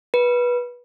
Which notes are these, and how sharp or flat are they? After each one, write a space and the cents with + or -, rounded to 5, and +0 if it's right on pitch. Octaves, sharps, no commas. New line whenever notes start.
B4 -20